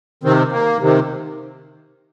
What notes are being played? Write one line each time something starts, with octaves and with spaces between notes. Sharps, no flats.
C3 D#3 C4
A#3
C3 D#3